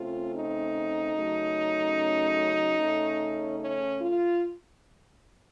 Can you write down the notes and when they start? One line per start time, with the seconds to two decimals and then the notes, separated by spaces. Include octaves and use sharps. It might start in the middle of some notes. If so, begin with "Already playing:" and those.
Already playing: C#3 A3 C4 F4
0.34 D#4
1.15 C#3 F#3 A3 C#4
2.78 C#3 A3 C#4
3.59 C#4
4.00 F4